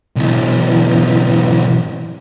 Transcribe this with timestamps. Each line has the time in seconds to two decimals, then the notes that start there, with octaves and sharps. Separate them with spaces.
0.16 B1 E3